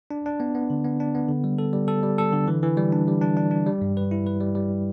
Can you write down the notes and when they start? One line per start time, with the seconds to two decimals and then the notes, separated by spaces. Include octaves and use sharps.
0.11 D4
0.26 D4
0.40 B3
0.55 B3
0.70 D3
0.85 B3
1.00 D4
1.15 B3
1.29 D3
1.44 G3
1.59 A4
1.73 G3
1.88 A4
2.03 G3
2.18 A4
2.32 D3
2.48 E3
2.63 E3
2.77 G3
2.92 D4
3.08 G3
3.22 D4
3.37 D4
3.51 D4
3.66 G3
3.82 G2
3.97 B4
4.11 E4
4.27 B4
4.41 G3
4.55 G3